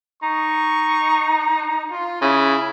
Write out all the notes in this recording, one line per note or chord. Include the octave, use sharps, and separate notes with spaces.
D#4 C#6
F4
C#3 E4